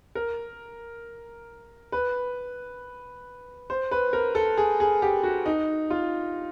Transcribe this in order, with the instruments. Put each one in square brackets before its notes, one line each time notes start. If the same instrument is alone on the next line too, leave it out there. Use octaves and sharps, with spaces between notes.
[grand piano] A#4
B4
C5
B4
A#4
A4
G#4
G#4
G4
F#4
D#4
F4